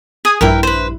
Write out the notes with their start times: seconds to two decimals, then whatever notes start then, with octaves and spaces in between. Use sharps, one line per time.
0.25 G#4 G#5 D#6 G#6
0.41 A#1 G2 E4 A#4 B4 G5
0.63 B4 C5